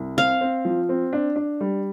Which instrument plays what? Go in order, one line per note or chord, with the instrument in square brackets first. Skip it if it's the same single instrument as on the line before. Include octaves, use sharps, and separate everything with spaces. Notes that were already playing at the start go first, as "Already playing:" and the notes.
Already playing: [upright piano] C2
[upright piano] C4 [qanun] F5
[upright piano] C4
F3
C4
D4
D4
G3